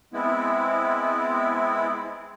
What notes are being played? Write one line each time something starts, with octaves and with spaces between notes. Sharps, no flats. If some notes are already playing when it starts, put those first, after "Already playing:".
G#3 B3 C4 E4